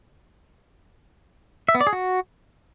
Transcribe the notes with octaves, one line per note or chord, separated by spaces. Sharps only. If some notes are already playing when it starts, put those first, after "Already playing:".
E5
B3
D5
G#4
F#4